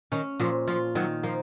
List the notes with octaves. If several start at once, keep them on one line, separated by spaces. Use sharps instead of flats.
D#3 C#4
A#2 F3
F3 F4
D#3 F#3
F3 A#3